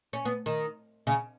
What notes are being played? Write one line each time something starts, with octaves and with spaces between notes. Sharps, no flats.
C#4
B3
D#3
C#3